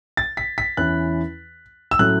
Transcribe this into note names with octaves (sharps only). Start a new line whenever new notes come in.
A6
B6
B6
E2 E3 C#4 E4 F#6
E6
A2 F#3 A3 C#4 F#6